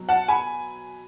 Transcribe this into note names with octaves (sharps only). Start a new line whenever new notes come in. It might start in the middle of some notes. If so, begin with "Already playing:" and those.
Already playing: B2 F#3
F#5 A5
G#5 B5